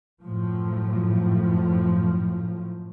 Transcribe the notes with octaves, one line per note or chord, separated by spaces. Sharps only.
F#2 A2 F3